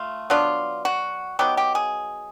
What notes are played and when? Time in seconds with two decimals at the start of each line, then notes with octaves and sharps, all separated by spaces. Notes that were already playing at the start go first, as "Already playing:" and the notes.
Already playing: A3 F4
0.30 F#3 B3 D4 F4
0.85 F#4
1.39 F#3 B3 D#4 G4
1.57 G4
1.75 G#4